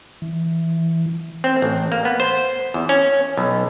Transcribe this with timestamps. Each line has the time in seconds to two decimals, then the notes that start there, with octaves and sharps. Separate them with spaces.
0.22 E3
1.44 C4
1.62 A1
1.92 A#3
2.05 B3
2.20 C5
2.74 E2
2.89 C#4
3.37 B1